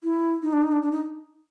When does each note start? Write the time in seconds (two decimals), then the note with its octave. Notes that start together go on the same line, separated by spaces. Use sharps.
0.04 E4
0.42 D#4
0.53 D4
0.62 D#4
0.72 D4
0.82 D4
0.92 D#4